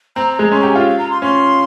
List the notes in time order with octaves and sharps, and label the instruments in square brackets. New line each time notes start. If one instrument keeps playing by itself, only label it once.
[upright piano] C4 [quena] A#5
[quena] A#5
[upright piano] G#3
[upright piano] C#4 [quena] C6
[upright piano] G4 [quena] A#5
[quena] G#5
[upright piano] F4 [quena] F5
[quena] F5
A#5
C6
[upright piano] C#4 [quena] C6